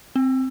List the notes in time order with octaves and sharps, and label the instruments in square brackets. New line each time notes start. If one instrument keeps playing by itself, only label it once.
[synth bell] C4